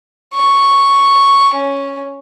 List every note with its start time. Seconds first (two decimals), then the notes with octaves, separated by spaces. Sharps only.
0.34 C#6
1.54 C#4